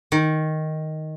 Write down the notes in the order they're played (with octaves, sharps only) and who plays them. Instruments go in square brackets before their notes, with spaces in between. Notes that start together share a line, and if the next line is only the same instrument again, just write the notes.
[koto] D#3